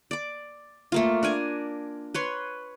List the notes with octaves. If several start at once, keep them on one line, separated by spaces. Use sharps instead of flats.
D5 D6
A3 A#3 F4
D4 A#4 G#5
B4 C#5 C6